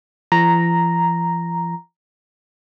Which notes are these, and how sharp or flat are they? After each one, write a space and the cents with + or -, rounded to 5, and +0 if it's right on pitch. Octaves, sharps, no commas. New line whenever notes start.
F3 -45 A#5 +0